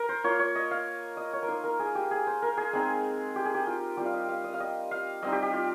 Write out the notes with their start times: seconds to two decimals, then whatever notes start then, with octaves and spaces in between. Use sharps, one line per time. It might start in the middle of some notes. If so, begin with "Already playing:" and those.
Already playing: A#4
0.09 C5
0.24 A#3 F4 C#5
0.39 C#5
0.55 D#5
0.71 F5
1.17 D#5
1.33 C#5
1.43 A#4
1.48 A#3 D#4 C5
1.64 A#4
1.79 G#4
1.95 G4
2.11 G#4
2.27 C5
2.42 A#4
2.57 G#4
2.73 G#3 C4 D#4
3.36 G4
3.45 G#4
3.54 G4
3.67 F4
3.97 G3 C4 F4 G4
4.06 F5
4.13 D#5
4.28 F5
4.44 D#5
4.54 F5
4.60 D#5
4.91 F5
5.22 G3 C4 D#4 D#5
5.32 G4
5.43 G4
5.53 F4